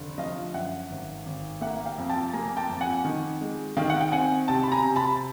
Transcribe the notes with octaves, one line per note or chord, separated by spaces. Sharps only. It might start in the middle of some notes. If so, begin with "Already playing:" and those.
Already playing: F1 D3
F3 D#5 F5
F#2 E5 F#5
G#1
G#1
A#3 E5 F#5
F5 G5
F2
G5 A5
A#3 G#5 A#5
G5 A5
F2
F#5 G#5
D#3
G#3
D#3 F5 G5
F#5
G5
C4 F#5 G#5
C3 G5 A5
B5
G#5 A#5
C3
A5 B5